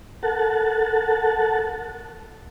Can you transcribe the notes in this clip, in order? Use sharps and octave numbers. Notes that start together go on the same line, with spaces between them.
A4 A#4 F#5 A5